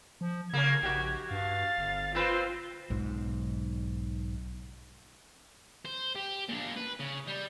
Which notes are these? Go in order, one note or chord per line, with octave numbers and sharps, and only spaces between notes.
F3
C#3 A#3 C#4 G#6
A#1 F#4 G4
G2 F5 A6
G1
C4 F4 B4 C5
B1 G#2
C5
G4
A#2 D4
B4
C#3
G3